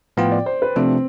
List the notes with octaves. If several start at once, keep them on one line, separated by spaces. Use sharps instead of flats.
A2 F3 B3 F4 G5
D5
C5
B4
C3 F3 A3 C4 D4 F4